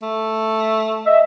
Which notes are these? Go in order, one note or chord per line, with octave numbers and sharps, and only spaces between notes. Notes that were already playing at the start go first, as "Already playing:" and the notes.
A3
D#5 E5